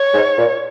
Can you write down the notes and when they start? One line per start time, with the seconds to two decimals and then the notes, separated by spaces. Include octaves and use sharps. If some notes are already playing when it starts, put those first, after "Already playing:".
Already playing: C#5
0.14 G#2
0.38 A#2